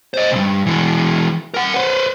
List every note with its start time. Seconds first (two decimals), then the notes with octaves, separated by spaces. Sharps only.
0.14 C5 D#5
0.32 C2 G2
0.66 E3 G#3
1.54 A#4 F#5
1.74 B4 C5